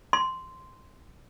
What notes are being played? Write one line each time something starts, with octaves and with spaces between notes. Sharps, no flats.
C6